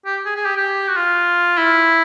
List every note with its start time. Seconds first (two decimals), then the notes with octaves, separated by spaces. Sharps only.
0.06 G4
0.26 G#4
0.36 G#4
0.46 G4
0.57 G4
0.88 F#4
0.97 F4
1.57 E4